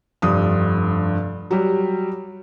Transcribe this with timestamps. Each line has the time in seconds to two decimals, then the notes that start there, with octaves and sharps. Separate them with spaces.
0.22 F1 G2 D#6
1.51 F#3 G3